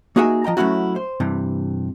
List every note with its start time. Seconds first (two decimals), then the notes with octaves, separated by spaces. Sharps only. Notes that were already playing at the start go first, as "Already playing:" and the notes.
0.16 A#3 D#4 F#4 G#4 A#4 E5
0.44 F3 D#5 G5 A#5
0.57 F#3 G#3 A3 C#4 E4 F#4
0.96 C5
1.20 G2 C3 E3